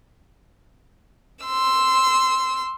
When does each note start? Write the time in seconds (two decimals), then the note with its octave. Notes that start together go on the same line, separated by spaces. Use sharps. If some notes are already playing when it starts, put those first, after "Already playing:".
1.45 C6 E6